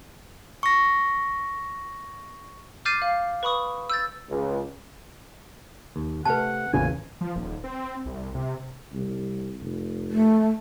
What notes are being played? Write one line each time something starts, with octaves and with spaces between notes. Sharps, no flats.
C#6 A#6
D6 F6 G6 A6 C7 D#7
F5
B4 B5 C#6 D#6
E6 G6 A6
C#2
D#2
C3 A3 B4 F#5 A5
A1 E2 A#2 C#3 C#4 G#5
F3
D#1
C4
C2
C3
C2
F1
A3